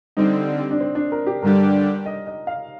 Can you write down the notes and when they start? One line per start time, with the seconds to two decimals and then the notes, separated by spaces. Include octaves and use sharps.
0.17 D3 G3 C4 D#4
0.71 D4
0.80 C4
0.95 D4
1.12 A#4
1.27 G4
1.43 G2 D3 G3 D4 G4 A#4
2.06 D#5
2.27 D#5
2.47 F5